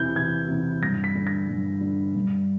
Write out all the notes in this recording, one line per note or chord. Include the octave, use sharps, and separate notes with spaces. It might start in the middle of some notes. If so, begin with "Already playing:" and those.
Already playing: E2 C3 E3 G6
E2 G#6
C3 E3
G2 A#6
B6
D3
A#6
G2
D3
G2